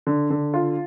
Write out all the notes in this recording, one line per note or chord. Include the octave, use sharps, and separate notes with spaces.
D3
D3
F4